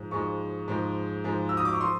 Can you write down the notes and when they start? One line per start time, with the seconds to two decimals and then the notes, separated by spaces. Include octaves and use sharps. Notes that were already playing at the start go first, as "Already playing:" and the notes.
Already playing: G#2 F3 G#3
0.11 G#2 F3 G#3 C#6
0.68 G#2 F3 G#3
1.24 G#2 F3 G#3
1.49 E6
1.57 D#6
1.65 D6
1.73 C#6
1.81 F3 C6